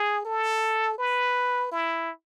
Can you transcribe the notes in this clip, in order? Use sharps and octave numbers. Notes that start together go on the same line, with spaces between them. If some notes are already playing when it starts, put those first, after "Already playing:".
Already playing: G#4
A4
B4
E4